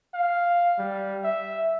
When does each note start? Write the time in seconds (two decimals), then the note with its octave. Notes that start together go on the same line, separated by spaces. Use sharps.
0.14 F5
0.79 G3
1.24 E5